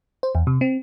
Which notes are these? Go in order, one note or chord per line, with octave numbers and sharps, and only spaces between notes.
C5
E2
C3
C4